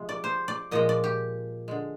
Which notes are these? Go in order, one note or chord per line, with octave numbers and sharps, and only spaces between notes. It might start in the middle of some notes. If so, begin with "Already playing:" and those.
Already playing: C3 F3 G#3
D5
C5
D5
A#2 F3 G#3 D#5
D5
G4
D3 G#3